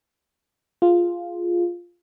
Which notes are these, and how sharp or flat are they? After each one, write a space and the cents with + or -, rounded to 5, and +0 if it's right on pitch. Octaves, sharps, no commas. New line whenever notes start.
F4 +0 G#4 +5